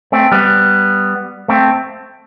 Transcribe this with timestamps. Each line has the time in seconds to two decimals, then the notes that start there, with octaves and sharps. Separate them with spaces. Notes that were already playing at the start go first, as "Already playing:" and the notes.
0.12 A3 C4
0.32 G3 B3
1.48 A3 C4